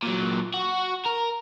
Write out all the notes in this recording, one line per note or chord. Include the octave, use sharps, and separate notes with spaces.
A#2 F#3
F#4
A#4